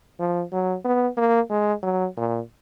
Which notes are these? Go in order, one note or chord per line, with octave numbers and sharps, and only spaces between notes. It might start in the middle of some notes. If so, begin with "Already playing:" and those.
F3
F#3
B3
A#3
G#3
F#3
A#2